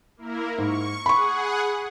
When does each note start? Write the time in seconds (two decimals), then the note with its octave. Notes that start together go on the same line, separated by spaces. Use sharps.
0.17 A#3 E4 A#4
0.58 G#2 C#6
1.06 G#4 F#5 B5 C#6